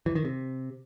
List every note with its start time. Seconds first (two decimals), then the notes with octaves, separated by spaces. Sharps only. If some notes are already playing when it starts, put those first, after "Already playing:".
0.06 E3
0.15 D#3
0.25 C3